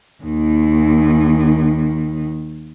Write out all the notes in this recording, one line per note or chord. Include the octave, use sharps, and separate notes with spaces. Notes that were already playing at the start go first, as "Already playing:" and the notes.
D#2 D#3